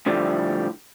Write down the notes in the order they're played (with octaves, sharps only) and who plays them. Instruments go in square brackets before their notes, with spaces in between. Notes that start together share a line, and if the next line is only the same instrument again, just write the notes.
[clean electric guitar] A2 D3 F3 G3 A3